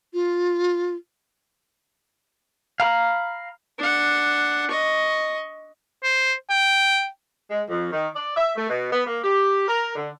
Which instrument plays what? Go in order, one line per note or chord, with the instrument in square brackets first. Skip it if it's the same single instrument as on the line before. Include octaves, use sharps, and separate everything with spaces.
[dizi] F4
[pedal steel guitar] F5 A#5 B5
[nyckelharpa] D4 F#5
D#5 C#6
[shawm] C5
G5
[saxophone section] G#3
F2
D#3
D5
E5
A3
B2
B3
A#3
G4
A#4
D3